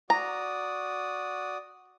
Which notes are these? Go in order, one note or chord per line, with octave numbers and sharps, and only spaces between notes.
F#4 D5 A#5 D#6